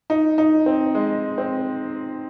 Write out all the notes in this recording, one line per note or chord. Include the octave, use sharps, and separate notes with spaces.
D#4
D#4
C4
G#3
C4